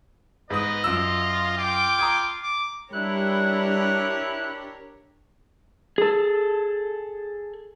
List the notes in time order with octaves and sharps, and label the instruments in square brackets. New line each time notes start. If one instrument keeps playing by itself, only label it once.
[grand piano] G#2 D#6 [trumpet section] B3 D#4 B4 [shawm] D#5
[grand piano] F#2 E6 [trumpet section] F4
[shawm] F4 [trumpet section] G5 D6
[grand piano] A#5 D#6 G#6
[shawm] D6
[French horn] G3 [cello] D4 G4 [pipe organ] E4 F#6 [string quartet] A#4 C#5
[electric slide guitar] G#4 A4